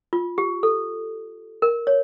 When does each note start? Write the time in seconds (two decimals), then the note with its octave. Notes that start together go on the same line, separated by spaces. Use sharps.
0.13 F4
0.38 G4
0.63 A4
1.62 A#4
1.87 C#5